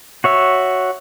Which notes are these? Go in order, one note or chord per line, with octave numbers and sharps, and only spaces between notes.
F#4 C#5 E5